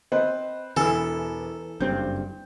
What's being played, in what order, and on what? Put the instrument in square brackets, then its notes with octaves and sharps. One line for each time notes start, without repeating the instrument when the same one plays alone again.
[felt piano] C4 B4 C5 [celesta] D#5
[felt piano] E1 E6 [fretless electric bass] E3 [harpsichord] A4 [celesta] G#5
[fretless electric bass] F#1 G2 C4 [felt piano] G6